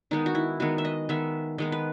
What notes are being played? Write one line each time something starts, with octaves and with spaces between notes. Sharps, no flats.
D#3 G#3 B3 D#4
F#4
E4
D#3 G#3 B3 F#4
E5
D#5
D#3 G#3 B3 E5
D#3 G#3 B3 D#5
B4